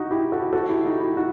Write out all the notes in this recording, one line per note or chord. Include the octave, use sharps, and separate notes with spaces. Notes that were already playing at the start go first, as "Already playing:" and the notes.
Already playing: D#4 F#4
E4 G4
F#4 A4
F#4 A4
E4 G4
D#4 F#4
E4 G4
D#4 F#4